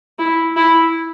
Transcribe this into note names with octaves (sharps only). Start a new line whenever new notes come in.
E4
E4